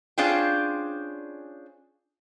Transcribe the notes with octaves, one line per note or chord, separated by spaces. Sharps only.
C#4 D4 F4 G#4 C5 G5